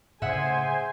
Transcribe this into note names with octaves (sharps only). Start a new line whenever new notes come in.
A2 C#3 G#4 C5 E5 F#5 G#5